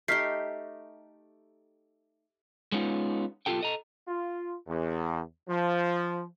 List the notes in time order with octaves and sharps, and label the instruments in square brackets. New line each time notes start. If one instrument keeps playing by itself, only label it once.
[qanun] A3 D#4 G4 [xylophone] F6 B6 C7
[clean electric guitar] G#3 B3 C#4 D#4 F4
B1 A#2 F4 G4 A4 G5
A4 D#5 A#5
[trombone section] F4
E2
F3